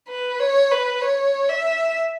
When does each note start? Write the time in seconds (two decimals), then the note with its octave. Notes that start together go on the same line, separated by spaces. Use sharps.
0.08 B4
0.39 C#5
0.71 B4
1.01 C#5
1.49 E5